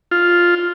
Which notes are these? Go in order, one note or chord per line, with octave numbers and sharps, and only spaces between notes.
F4